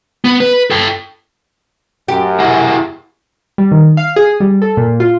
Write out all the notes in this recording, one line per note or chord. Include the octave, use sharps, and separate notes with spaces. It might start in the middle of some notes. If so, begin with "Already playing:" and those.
B3
B4
A4 G5
F#2 G4
E4 F#4 G#4
G3
D#3
F5
G#4
G3
A4
A#2
F4